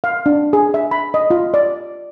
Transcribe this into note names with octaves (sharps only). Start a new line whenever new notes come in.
F5
D4
G#4
E5
B5
D#5
F4
D5